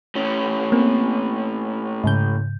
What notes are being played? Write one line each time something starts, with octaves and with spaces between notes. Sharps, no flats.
A2 C#4
A#3 C4
G#2 C#3 G6